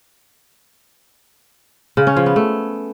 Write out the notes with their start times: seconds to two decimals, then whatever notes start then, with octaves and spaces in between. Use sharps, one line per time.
1.97 C#3
2.07 C#4
2.17 F3
2.26 B3
2.36 A3